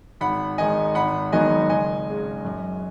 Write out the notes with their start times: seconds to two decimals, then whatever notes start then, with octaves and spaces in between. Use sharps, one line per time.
0.21 G#1 F#5 B5
0.58 G#2 D#3 G#3 D#5 G#5
0.95 G#1 F#5 B5
1.32 G#2 D#3 F#3 B3 D#5 G#5
1.70 C#2 D#5 G#5
2.07 C#3 G#3
2.44 F#2